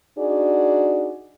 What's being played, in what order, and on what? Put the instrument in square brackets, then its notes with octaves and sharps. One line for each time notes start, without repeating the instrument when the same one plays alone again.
[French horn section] D4 D#4 F#4 G#4 D5